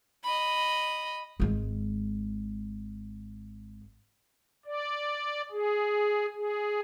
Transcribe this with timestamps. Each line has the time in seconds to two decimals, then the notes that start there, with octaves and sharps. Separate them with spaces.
0.24 D#5 B5
1.40 G#1 G#3
4.66 D5
5.51 G#4
6.35 G#4